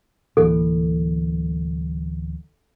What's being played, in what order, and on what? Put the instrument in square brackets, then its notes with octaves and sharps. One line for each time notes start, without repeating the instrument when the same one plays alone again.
[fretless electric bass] D1 E3 A#3 [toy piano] A4